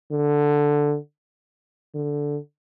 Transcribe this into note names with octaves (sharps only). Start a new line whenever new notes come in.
D3
D3